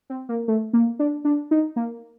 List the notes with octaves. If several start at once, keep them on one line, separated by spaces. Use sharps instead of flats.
C4
A#3
A3
A#3
D4
D4
D#4
A#3